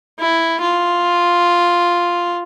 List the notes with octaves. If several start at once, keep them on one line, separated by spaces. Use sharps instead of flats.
E4
F4